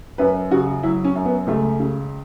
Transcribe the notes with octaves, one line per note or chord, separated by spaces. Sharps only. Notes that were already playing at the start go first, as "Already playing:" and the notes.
F#2 B4
C#3 F#4
F#3 E4
C#4
F#2
B3
C#2 A3
C#3